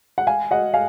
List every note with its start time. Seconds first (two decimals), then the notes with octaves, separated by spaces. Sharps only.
0.18 F#5
0.27 F5 G#5
0.51 D#5 F#5
0.74 F5 G#5